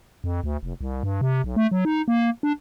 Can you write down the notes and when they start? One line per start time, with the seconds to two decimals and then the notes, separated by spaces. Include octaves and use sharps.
0.24 F2
0.44 D2
0.63 F1
0.81 C2
1.03 G2
1.21 C3
1.44 B1
1.56 A3
1.71 F#3
1.85 D#4
2.08 A#3
2.43 D4